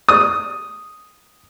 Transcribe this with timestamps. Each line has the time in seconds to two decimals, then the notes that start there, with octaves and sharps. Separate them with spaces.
0.09 D#6